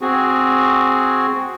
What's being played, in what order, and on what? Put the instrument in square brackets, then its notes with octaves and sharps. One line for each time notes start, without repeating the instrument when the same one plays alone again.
[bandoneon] C4 F#4 G#4